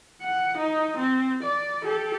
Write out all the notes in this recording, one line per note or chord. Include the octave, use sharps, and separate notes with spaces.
F#5
D#4
C4
D5
G4 A4